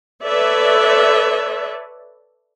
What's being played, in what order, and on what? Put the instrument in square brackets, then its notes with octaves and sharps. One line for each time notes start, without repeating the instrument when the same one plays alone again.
[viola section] A4 B4 C#5 D5 E5